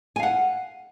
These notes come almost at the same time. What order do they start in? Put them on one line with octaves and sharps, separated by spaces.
G#5 F5 F#5